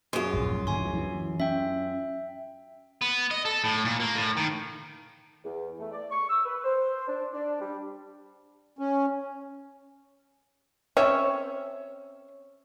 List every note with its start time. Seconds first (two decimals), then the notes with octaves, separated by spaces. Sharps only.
0.13 F#2 F4 G#4 C6
0.33 E1 A#1 G2
0.67 G2 A#2 D3 G#5 C6
0.79 D2 E3
0.95 E3
1.40 C#4 E5 G5
3.01 B3
3.31 D#5
3.45 A4
3.64 A2
3.85 A#2
4.00 A#3
4.16 A2
4.37 D#3
5.45 E2
5.80 A3
5.92 D5
6.11 C#6
6.30 E6
6.46 B4
6.64 C5
7.08 D4
7.33 D4
7.61 G3
8.79 C#4
10.97 C4 C#4 C#5 E5